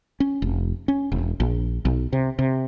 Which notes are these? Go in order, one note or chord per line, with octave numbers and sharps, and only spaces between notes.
C#4
F1
C#4
E1
A#1
B1
C3
C3